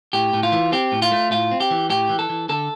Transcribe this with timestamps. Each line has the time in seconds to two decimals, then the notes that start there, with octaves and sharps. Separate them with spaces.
0.13 A2 G4
0.33 A2
0.43 F4
0.52 E3
0.72 C4 G4
0.92 A2
1.02 F4
1.12 A3
1.31 A2 F4
1.51 C4
1.60 G4
1.71 E3
1.90 A2 G4
2.09 E3
2.19 A4
2.30 E3
2.49 D3 A4